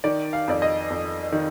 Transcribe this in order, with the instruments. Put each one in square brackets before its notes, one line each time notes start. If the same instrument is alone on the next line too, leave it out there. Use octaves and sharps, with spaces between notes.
[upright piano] D#3 D5
F5
F2 D5
D#5
F2
D#3